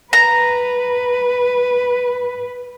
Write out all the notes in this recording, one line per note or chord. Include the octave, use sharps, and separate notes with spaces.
B4 A#5